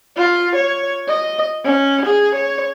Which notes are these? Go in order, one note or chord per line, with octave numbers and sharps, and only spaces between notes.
F4
C#5
D#5
C#4
G#4
C#5